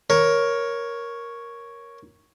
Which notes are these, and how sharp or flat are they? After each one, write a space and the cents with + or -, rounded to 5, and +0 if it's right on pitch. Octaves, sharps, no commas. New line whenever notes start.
A#4 +10 C#5 +0